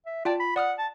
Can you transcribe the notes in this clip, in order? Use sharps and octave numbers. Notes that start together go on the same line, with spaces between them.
E5
F4 D5 G5 A5
B5
D5 F#5 D#6 F6
A5